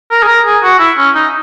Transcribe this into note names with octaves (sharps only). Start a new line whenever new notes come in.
A#4
G#4
A#4
G#4
F#4
E4
C#4
D#4